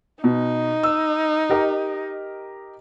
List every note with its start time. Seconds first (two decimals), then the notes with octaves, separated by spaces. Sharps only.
0.24 B2 D#4
0.83 E6
1.49 G4 A#4 D#5